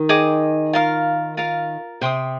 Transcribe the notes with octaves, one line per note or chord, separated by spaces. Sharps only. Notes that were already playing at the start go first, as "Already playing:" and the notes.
Already playing: D#3
G#4 D#5 G5 D6
F4 A#4 F5
F4 A#4 F5
C3 C5 G5 C6 D#6